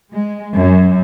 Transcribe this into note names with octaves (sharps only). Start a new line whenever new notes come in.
G#3
F#2